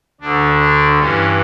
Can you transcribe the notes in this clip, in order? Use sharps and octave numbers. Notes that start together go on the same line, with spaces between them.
D2 D3 D4
D4
G2 E3 C#4